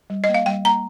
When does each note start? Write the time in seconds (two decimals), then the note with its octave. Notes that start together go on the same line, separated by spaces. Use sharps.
0.10 G3
0.24 D#5
0.29 A#3
0.34 F5
0.46 G3 G5
0.65 A#3 A#5